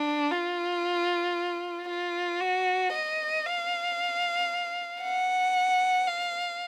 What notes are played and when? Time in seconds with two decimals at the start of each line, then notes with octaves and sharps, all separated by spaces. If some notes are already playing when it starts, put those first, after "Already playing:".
Already playing: D4
0.32 F4
1.89 F4
2.40 F#4
2.93 D#5
3.46 F5
5.02 F#5
6.07 F5